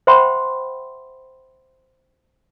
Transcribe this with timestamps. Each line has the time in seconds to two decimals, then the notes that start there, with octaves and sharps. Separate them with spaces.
0.07 C5 E5 F#5 G5 B5 C6